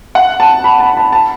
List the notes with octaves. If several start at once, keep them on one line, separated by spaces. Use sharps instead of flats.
F#5
A5
B5
A5
A5
A5